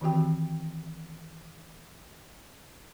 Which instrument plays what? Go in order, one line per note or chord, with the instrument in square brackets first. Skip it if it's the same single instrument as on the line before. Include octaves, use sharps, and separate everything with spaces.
[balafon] D#3 E3 C4 F#4 G4 G5